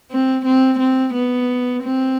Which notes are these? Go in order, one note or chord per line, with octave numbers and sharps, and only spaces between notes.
C4
C4
C4
B3
C4